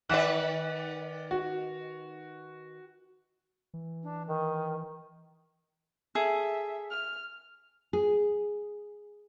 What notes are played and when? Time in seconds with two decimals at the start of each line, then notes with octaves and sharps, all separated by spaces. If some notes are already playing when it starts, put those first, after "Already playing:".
0.09 D#3 B4 D5 F#5 F#6
1.31 F#4
3.74 E3
4.03 D4
4.27 D#3
6.15 G#4 A4 E5
6.90 F6
7.93 G#4